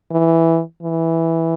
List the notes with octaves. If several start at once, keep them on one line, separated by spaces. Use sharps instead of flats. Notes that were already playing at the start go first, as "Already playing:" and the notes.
E3
E3